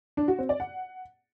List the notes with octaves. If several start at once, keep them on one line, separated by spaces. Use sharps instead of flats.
D4
F#4
C4
D5
F#5